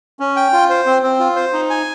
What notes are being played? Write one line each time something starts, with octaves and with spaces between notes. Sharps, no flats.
C#4
G5
F4
C5
C4
C4
F4
C5
D#4
G#5